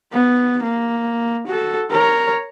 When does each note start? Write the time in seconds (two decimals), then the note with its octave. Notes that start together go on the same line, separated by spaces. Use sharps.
0.12 B3
0.63 A#3
1.47 F#4 A4
1.91 A#4 C#5